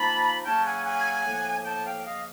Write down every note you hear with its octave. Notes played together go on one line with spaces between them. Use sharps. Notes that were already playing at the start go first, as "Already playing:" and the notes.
Already playing: F3 A#3 D#4 A5 B5
C#3 F#3 A#3 C#4 G5 A5
F#5 G#5
F#5 G#5
A2 F3 A#3
G5 A5
F5 G5
C#3 F3 A#3 D#5 F5